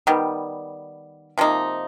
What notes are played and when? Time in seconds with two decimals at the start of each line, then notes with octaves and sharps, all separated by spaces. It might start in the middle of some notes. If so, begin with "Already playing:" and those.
0.07 D#3 G3 B3
1.38 C3 F3 A#3 D#4